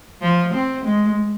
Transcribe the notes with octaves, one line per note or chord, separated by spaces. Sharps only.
F3
C4
G#3